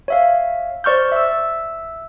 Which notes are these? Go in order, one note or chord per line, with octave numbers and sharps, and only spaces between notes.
C#5 E5 F5
C5 D5 C#6 F6 G6
E5 E6